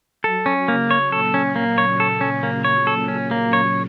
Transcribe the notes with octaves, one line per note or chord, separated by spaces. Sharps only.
F#3 A4
C#4
C#3 A#3
C#5
A#2 A4
C#4
A#3
C#5
A4
C#4
A#3
C#5
A4
C#4
A#3
C#5